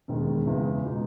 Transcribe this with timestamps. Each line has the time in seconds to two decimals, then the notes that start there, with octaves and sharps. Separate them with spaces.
0.08 E1 D#2 D#3 G#3
0.46 F#1 E2 C#3 E3 G#3
0.84 B2 G#3 D#4